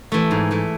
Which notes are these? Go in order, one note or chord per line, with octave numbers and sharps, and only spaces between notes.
E3 A3
G#2
E3 A3